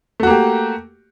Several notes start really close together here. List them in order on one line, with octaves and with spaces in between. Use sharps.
A3 F#4 A#3 G4